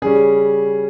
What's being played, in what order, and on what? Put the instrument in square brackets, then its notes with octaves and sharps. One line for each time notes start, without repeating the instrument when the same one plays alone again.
[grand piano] C#3 G3 C#4 G#4